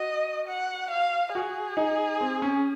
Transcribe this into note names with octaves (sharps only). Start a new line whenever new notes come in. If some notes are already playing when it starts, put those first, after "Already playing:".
Already playing: F#4 D#5
F#5
F5
F#4 G#4
D#4
C4
C#4